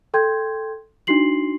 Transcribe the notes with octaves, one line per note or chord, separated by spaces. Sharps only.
A4 G5 C6 G6 G#6
D4 D#4 F#4 C6 C7 F#7